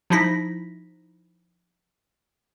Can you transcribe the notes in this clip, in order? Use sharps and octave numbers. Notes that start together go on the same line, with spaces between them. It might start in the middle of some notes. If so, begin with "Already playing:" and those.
F3 D#4 E4 A#6 B6